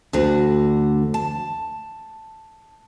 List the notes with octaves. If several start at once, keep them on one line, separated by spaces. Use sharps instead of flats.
D2 D3 F#4
A5